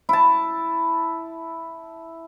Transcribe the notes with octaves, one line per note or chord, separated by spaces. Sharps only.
E4 A5